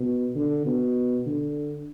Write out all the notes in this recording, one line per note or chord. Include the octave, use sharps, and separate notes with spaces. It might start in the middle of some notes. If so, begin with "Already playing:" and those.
Already playing: B2
D3
B2
D3